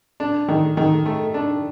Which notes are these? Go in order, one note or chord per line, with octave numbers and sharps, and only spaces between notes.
D4
D#3
D#3
A3
D4